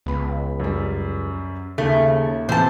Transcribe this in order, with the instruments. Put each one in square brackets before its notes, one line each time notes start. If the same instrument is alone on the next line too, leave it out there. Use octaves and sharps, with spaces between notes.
[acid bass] C#2 [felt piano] B3 B5
[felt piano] F#2 G3
[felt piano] D#2 [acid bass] C#3 [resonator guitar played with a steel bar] A3
[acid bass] A2 [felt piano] C3 E3 G6 [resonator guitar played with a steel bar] C5 A5